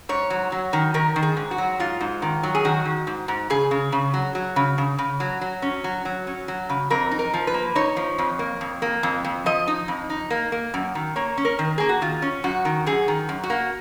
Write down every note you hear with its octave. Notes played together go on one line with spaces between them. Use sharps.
G#2 C#5
F#3
F#3
D#3
D#3 A#4
D#3
G#4
G#2
F#4
F#3
G#2 F4
G#2
D#3
F#3
G#4
D#3 F#4
D#3
G#2
G#2
C#3 G#4
C#3
C#3
F#3
F#3
C#3
C#3
C#3
F#3
F#3
C#4
F#3
F#3
C#4
F#3
C#3
F2 A#4
D#4
A#4
F3
B4
A#3
D#4 C#5
F3
F2
A#3
F2
A#3
F2
F2
F3 D#5
D#4
F2
D#4
A#3
A#3
F#2
D#3
A#3 C#5
C#4
A#4
D#3
A#3 G#4
F#4
D#3 F4
C#4
F#2 F#4
D#3
F#2 G#4
D#3
F#2
F#4
A#3